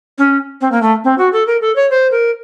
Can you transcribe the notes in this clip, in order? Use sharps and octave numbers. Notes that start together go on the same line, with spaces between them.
C#4
C4
A#3
A3
C4
F#4
A4
A#4
A4
C#5
C5
A#4